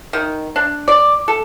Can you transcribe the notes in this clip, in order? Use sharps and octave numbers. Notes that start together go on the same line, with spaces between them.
D#3
D4
D5
A4